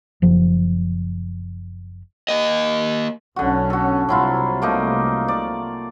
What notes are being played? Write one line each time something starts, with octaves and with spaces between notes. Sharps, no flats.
F#1 F3
A#3 D#5
B1 D3 C#4 F#4
F#4 A4
C2 C3 F#3 E4 F4
A3 A#3 D#4
D5